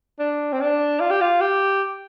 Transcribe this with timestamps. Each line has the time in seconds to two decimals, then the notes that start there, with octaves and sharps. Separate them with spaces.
0.20 D4
0.53 C4
0.61 D4
1.00 F4
1.10 G4
1.21 F4
1.41 G4